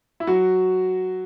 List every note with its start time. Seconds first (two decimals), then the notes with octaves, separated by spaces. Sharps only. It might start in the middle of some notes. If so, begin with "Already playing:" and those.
0.20 E4
0.27 F#3 F#4